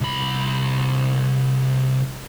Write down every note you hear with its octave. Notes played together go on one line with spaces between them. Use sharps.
C2 B5